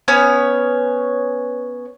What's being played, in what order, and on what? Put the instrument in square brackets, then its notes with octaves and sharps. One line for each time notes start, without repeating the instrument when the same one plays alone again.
[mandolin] B3 C#4 C#5